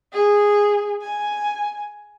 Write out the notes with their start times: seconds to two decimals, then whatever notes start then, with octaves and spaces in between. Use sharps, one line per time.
0.13 G#4
1.02 G#5